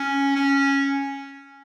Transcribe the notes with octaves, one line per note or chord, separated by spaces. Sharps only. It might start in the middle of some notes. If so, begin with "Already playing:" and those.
Already playing: C#4
C#4